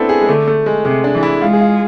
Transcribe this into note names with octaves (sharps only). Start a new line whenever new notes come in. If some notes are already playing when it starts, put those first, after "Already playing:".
Already playing: A3 B3 C4 D4 E4 A4
G#4
G#3
D3 A3
A3
G#3
C3 G#3
D4
E3
E4
G#3 F4
G#4
F4